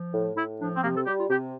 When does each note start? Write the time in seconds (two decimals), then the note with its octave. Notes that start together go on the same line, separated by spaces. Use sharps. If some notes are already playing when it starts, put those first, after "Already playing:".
Already playing: F3
0.13 A2
0.36 A2 E4
0.59 F3 D4
0.76 C4
0.83 C3 A#3
0.95 A4
1.06 G3 G4
1.18 F4
1.29 C3 G4